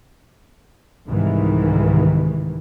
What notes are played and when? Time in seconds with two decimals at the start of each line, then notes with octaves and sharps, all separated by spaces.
1.07 C2 G#2 D#3 E3